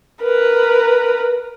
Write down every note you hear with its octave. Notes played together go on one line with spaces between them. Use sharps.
A#4 B4